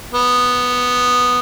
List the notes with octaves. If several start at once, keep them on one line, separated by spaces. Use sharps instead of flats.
B3